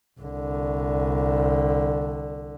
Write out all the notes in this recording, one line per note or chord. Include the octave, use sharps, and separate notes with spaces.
C2 D3